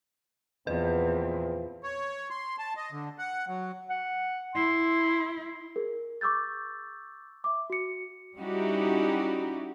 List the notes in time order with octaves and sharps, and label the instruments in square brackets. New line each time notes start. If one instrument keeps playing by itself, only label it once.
[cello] E2 [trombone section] A#2 F3 C4 [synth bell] B4
[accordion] C#5
C6
A5
D#5
D3
F#5
F#3
[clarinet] F#5
[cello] E4 [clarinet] C6
[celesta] G#4 A#4
C#6 D6 E6 G6 A6
E5 D6
F#4 C#7
[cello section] G3 C#4 D#4 E4 F#4 G4